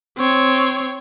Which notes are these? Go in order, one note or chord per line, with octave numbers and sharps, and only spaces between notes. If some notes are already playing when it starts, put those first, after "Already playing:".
C4 C#5